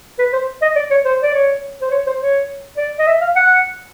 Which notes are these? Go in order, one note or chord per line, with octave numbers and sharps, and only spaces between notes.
B4
C5
D#5
D5
C#5
C5
D5
C#5
C5
C#5
C5
C#5
D5
D#5
E5
F5
F#5